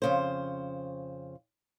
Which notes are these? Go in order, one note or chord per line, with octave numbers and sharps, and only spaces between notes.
F2 C#3 C5